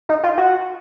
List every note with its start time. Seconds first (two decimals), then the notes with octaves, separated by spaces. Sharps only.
0.09 D#4
0.23 F4
0.37 F#4